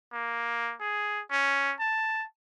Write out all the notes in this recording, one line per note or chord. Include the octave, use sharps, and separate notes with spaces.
A#3
G#4
C#4
A5